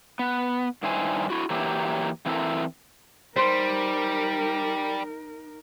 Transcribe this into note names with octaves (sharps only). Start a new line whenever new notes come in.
B3
G2 D#3 E4 C5 G#5
E4 F#4
E3 F#3 A#3 E4 G4
E3 C4 E4 F#4 A4 A#4
G3 D#4 A#4 C5